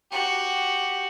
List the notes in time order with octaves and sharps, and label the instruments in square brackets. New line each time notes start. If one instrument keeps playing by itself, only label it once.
[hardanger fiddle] F#4 G4